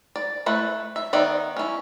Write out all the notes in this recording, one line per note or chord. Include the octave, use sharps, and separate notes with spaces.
D5
A3 E4 B4
E5
D#3 B3 D5 E5
C#4 E4